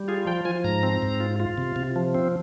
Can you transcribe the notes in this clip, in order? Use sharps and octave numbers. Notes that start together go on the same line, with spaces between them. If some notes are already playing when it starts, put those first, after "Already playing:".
Already playing: G3
F4 G#4
F3 G5
F3 G#5
G#2 A#5
C4
G#2
F4
F4
C3
C3
F3
C4